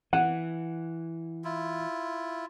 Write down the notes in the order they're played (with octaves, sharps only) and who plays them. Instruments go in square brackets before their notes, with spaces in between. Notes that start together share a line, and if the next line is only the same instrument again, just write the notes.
[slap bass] E3 [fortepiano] F#5
[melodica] E4 F4